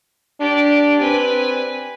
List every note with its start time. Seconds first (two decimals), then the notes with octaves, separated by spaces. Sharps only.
0.40 D4 G4 D5
1.01 C4 B4 G#5